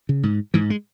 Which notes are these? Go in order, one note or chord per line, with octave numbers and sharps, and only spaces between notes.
C#3
G#2
G#2 E3
G#3